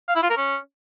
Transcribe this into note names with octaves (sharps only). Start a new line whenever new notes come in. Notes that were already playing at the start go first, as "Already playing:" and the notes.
F5
E4
F4
A#4
C#4